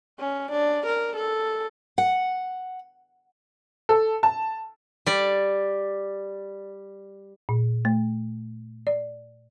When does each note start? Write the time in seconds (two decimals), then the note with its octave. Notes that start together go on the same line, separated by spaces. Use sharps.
0.19 C#4
0.51 D4
0.86 A#4
1.16 A4
1.98 F#5
3.89 A4
4.23 A5
5.06 G3 D5
7.49 A#2
7.85 A3
8.87 D5